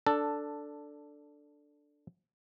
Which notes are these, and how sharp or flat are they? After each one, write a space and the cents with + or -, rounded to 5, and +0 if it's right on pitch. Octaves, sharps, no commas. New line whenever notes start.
D4 +0 A4 +10